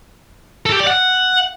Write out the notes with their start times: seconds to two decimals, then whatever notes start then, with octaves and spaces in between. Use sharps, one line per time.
0.66 A4
0.73 G4
0.80 D5
0.87 F#5